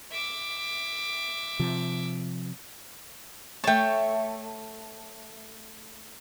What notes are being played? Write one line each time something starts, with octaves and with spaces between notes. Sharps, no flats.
E5 D6
C3 F3
A3 C#5 G5 A5